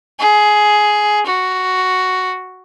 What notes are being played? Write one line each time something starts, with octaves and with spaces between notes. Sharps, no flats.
G#4
F#4